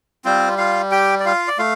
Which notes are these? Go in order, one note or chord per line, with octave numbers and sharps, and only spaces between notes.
G3 C4 F4 C5
F4 F5
G4 G5
D5
F4 F5
D5
A3 F4 F5